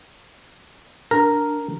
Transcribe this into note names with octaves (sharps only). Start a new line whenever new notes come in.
D4 A#4